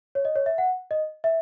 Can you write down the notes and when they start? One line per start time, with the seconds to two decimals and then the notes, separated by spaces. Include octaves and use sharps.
0.15 C#5
0.25 D#5
0.36 C#5
0.46 E5
0.58 F#5
0.91 D#5
1.24 E5